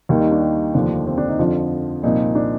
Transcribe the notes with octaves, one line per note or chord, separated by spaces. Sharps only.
D#2 D#3 G3
D#4
D4
D#4
F1 D#2 D3 F3 D4
C4
D4
D#4
F2 D3 F3 F4
C2 A#2 F3 D#4
D4